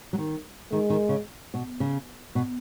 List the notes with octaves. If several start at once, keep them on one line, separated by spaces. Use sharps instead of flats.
F#3
D#3
D#3 G#3
D#3
C#3
B2
C#3
B2